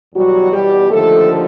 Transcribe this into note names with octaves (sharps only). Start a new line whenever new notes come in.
E2 B2 F#3 G3 F#4
G3 G4
D#2 D3 F3 A3 A4